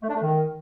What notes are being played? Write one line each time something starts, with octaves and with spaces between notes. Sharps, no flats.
A3
D4
A3
D#3